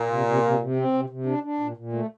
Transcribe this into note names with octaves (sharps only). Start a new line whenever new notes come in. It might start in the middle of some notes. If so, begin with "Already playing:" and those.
Already playing: A#2
C3
C3
C3
C3
C4
C3
C3
D4
D4
A#2
A#2
A3